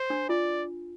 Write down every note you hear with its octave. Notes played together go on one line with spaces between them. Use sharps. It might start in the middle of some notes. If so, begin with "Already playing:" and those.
Already playing: C5
D4
F4 D5